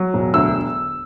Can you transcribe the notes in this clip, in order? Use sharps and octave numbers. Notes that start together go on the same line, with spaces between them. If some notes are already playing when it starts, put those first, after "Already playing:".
Already playing: F#3
E1
D2 E6